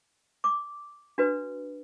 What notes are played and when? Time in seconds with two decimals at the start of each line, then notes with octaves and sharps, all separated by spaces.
0.44 D6
1.18 D4 F#4 B4